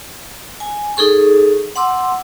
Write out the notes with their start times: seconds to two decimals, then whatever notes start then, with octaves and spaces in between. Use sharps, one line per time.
0.60 G#5
0.97 D#4 G#4 A4 C#6
1.76 F#5 C6 D6 E6